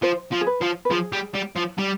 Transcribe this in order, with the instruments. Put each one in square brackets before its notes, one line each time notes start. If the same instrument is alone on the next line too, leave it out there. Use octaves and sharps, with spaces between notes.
[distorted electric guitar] F3 [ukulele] C5
[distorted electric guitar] F3
[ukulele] G#4
B4
[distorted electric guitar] F3
[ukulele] B4
[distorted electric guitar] F3 [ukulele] G#4
[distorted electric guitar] G3
G3
F3
G3